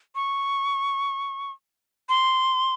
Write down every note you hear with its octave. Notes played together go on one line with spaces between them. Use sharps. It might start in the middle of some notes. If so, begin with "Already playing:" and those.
C#6
C6